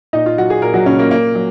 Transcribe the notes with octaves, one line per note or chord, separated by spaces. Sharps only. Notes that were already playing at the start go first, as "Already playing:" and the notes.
A#2 D#4 D#5
F4
F#3 F#4
G#4
A#2 A#3 A#4
F#3 F#4
A#2 C#3 C#4
A#3
A#2 A#3
F#3